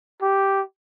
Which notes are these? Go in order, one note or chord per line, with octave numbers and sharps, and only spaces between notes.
G4